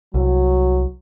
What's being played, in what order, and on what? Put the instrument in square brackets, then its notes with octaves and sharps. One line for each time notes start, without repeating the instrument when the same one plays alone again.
[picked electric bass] C2 [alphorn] F#3